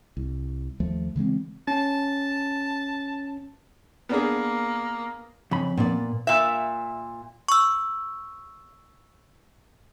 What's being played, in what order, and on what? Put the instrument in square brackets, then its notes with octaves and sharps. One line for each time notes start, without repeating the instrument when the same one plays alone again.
[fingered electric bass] C2
D#2 F3 A3
C#3 E3 G#3 C4
[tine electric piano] C#4 [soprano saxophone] A5
[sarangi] A#3 [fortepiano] B3 D4 G#4
[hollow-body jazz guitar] F2 B5 [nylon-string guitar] C#3
[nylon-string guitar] A#2 B3 D5
[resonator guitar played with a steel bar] A#2 E5
[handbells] C#6 E6